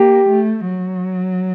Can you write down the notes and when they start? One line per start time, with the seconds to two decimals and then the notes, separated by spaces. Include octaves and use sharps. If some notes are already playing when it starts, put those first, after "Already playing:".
Already playing: A#3 G4
0.29 A3
0.68 F#3